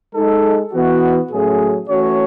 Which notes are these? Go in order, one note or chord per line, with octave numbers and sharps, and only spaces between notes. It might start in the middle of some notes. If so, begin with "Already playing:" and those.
G#3 D#4 A4
E3 B3 F#4
A2 F#3 A3 C#4 G#4
E3 A3 C#4 F#4 C#5